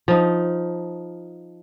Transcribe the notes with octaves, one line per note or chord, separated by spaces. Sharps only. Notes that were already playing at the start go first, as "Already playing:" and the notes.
F3 D#4